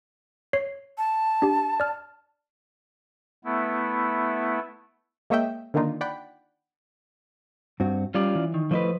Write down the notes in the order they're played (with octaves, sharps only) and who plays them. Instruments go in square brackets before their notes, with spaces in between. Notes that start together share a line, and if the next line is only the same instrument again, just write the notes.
[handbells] C#5 C7
[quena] A5
[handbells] D4 G4
D5 F6
[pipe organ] A3 B3 E4
[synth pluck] G#3 A#3 C#5 D#5 E5 G5
D3 D#3 A#3 D4 D#4 F4
D5 F#5 G5 B5
[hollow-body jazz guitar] G2 C4 F#4
[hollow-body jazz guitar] G3 [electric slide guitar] C#4 F4 D5
[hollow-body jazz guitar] E3
[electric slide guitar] D#3
[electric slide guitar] A2 B4 [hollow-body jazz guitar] F3 C5 D#5